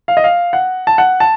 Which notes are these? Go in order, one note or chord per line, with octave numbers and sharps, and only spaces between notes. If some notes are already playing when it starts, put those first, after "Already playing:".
F5
D#5
F5
F#5
A5
F#5
A5